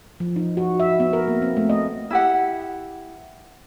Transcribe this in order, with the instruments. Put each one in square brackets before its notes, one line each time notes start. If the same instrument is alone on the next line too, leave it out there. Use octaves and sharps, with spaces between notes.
[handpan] F3
D#4
F#4
E5
B3
A#4
A#3
C4
A3
D#5
[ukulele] E4 G4 F#5